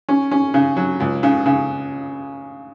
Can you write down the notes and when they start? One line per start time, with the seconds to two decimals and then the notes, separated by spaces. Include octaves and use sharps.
0.09 C#4
0.31 C#4
0.54 C#3
0.76 F#3
1.00 C#2
1.23 C#3
1.46 C#3